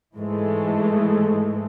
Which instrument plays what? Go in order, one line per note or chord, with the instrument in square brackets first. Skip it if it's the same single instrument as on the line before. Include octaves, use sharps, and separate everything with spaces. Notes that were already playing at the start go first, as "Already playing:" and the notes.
[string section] G#2 E3 G#3 A3